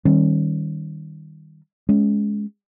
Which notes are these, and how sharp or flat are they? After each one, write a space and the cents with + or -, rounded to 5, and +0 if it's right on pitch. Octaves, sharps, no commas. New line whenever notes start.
D#3 +0 G3 +0 C#4 -30
G#3 +10 C#4 +10